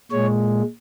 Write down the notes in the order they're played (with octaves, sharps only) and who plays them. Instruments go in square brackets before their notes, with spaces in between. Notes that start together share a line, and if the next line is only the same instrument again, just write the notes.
[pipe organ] A#2 G#3 C#5